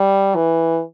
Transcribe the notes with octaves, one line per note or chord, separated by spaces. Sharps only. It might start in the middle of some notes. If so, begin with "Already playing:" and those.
Already playing: G3
E3